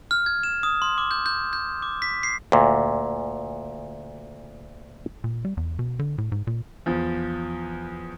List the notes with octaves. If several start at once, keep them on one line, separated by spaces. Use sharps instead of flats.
F6
G#6
E7
D#6
C6
D6
G6
G6
G6
D6
B6
C7
D2 A#2
A#2
G3
E2
B2
D3
A2
G#2
A#2
E2 F3